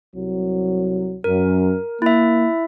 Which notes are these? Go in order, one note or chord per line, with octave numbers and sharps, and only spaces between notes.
C2 F#3
F#2 A#4
A#3 E4 E5